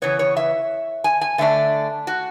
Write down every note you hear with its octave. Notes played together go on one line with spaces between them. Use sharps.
C#3 E3 B3 C#5
C#5
E5
G#5
G#5
D3 A3 D4 E5
F#4